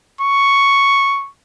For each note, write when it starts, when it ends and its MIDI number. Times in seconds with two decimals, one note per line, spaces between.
0.21 1.29 85